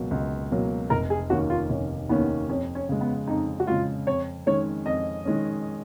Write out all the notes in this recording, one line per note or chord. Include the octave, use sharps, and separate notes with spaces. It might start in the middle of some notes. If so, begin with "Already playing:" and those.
Already playing: C#2 B2 F#3 A#3
C#2
B2 F#3 A#3
F1 A#4
G#4
D#2 D#3 A#3 C#4 F#4
F4
F1 C#4
D#2 D#3 A#3 B3 C#4
F2 C#4
C#4
C#3 G#3
B3
F2 D#4
F#4
C#3 G#3 F4
F2 C#5
D#3 G#3 C#4 C#5
F2 D#5
D#3 G#3 C#4